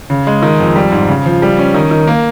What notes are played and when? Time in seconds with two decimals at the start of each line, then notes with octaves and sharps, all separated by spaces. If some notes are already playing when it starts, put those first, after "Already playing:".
0.10 C#3
0.27 G#3
0.42 D#3
0.60 F2
0.76 G3
0.92 G#2
1.08 C#3
1.26 F3
1.42 G3
1.59 C#4
1.74 D#3
1.91 D#3
2.07 A#3